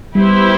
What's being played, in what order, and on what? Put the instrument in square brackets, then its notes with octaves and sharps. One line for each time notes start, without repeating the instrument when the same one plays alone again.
[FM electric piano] G3 [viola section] B3 E4 G4 C5